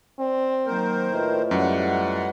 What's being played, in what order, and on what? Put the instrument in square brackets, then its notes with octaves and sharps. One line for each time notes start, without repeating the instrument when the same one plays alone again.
[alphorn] C4 [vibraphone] D5
[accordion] D#3 A#4 C5 [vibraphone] F#3 A#3
[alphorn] A2 [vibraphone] F4 B4 D#5
[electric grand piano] F#2 [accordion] G3 F#5